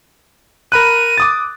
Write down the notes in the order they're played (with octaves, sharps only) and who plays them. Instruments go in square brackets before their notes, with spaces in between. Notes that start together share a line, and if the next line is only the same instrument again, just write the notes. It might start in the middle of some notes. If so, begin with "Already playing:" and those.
[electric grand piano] A#4 B5 F#6 [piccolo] D#7
[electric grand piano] D6 D#6 A6